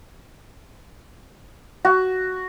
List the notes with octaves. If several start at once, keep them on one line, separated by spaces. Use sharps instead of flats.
F#4